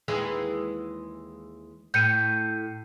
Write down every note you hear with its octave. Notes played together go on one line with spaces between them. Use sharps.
D#2 E3 G#3
A2 G6 C#7 D#7